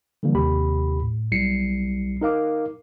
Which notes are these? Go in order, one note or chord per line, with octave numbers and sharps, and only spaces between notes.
D3 E3 F3 G3 A#3
A1 D#2 C3 G4 B5
A2
B1 G3 E4 C7 C#7
D#4 A#4 F5 D6